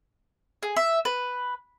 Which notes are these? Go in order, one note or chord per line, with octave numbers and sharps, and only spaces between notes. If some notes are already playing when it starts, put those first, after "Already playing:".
G#4
E5
B4